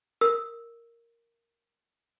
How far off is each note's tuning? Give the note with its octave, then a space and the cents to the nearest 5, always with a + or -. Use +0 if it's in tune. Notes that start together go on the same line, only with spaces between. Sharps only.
A#4 +0 E6 -5